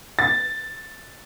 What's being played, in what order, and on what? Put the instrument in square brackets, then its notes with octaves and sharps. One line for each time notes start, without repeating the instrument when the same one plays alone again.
[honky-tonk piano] A6